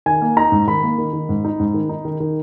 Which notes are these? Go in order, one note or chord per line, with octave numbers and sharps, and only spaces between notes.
D#3 G#5
A#3
D#4 A#5
G#2
D#3 B5
A#3
D#3
D#3
G#2
D#4
G#2
D#3
D#4
D#3
D#3